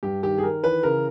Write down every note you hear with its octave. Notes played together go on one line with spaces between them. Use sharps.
G2 G4
D#3 G4
G#4
D#3 A#4
E3 B4
C#3 A#4